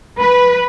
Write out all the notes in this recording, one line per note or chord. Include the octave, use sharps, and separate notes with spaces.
B4